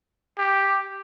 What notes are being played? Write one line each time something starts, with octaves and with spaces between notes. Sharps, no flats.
G4